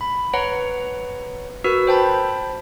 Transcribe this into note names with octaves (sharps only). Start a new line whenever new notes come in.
B5
B4 C#5 F#5 A#5
F#4 A#4 B4 E6
C5 G5 A5 B5